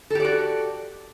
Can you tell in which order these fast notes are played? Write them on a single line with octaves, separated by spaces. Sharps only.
A4 G4 D5 F#4